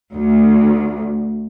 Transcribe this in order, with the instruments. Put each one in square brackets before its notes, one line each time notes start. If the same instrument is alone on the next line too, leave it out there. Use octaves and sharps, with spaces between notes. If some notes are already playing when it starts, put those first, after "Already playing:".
[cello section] D2